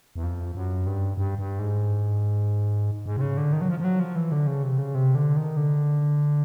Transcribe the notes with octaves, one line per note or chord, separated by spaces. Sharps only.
E2
F2
F#2
G2
G2
G2
G#2
G#2
C3
C#3
D3
D#3
F#3
F3
F3
F#3
F3
E3
D3
C#3
C3
C#3
C3
D3
D#3
D3